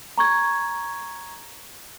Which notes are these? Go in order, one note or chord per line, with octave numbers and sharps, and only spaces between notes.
A#5 C#6 G#6